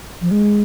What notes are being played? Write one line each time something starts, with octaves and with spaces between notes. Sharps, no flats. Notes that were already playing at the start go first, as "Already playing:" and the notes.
F3
G#3